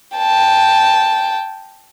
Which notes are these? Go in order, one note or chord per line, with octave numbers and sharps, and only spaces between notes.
G5 A5